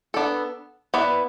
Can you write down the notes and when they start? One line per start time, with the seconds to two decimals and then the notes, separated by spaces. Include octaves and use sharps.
0.14 B3 D4 A4
0.94 B3 E4 B4 D5